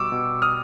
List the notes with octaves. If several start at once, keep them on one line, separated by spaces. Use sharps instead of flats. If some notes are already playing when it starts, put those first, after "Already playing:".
Already playing: B2 G3 C#6 D6 E6
B2
D#6 F6